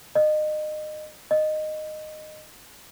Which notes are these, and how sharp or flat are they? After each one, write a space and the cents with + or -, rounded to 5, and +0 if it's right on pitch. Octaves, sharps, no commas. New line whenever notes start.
D#5 -30
D#5 -15